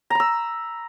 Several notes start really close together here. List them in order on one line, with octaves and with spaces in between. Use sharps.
A#5 B5 E6